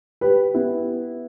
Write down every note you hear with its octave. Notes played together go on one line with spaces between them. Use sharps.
G4 B4
B3 E4